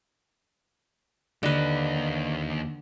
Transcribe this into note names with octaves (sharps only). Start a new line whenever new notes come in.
D#2 D3 B4 D#5